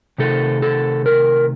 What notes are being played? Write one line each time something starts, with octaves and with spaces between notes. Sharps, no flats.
C3 D#3 A3 A4
A4
A#4